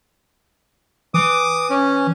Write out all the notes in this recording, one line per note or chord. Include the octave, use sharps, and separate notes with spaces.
E3 D6 D#6
C#4